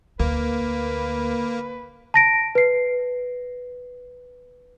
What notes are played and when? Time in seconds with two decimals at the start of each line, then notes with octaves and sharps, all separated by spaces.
0.20 D2 A#3 B4
2.14 A5 A#6 D7
2.55 B4 C7